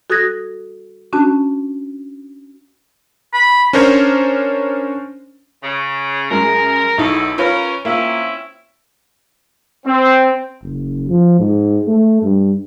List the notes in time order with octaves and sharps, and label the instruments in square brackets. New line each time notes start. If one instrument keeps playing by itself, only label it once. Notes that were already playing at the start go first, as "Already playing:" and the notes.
[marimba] F#4 A4 D#6 F#6 G#6 A#6
C#4 D4 F#4 A5
[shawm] B5
[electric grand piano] C#4 D4 A#4 C5 C#5
[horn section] C#3
[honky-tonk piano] F#2 G#3 [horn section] A#4
[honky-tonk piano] B1 D#4 E4 [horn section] F#4 G#4 A4
[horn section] C#4 A#4 [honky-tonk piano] F4 B4 C#5
[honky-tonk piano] A#3 F4 [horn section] C4 C#4 E4
[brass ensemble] C4
[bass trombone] F#1
F3
G#2
A3
G2